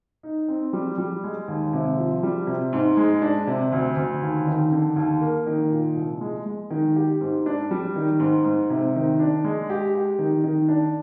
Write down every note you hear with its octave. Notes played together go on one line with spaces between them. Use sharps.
D#4
C4
G3
G3
G#3
D#2
C3
F3
G3
C3
G#2
G#3
D4
C3
D2
D2
D#2
D#3
D3
D#2
A#3
D#3
A#2
C2
G#3
G#3
D#3
G4
G#2
D4
G3
D#3
G#2
G#2
C3
D#3
D4
G#3
G4
G4
D#3
D#3
D4